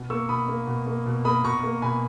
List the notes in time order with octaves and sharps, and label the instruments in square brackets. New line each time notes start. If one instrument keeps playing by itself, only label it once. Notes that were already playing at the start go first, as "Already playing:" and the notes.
Already playing: [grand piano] B2
A#3 C#6 E6
B2 B5 D#6
A#3
B2
A#3
B2
A#3 B5 D#6
B2 A#5 C#6
A#3
B2 G#5 B5